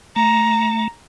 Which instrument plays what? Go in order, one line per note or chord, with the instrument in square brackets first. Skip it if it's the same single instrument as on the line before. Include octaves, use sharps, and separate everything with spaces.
[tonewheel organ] A3 [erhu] A#5